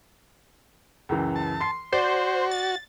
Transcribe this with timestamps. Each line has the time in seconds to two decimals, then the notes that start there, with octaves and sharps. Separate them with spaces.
1.09 C#2 F#2 E3
1.36 A5
1.60 C6 C7
1.92 F#4 C5 D5
2.51 A6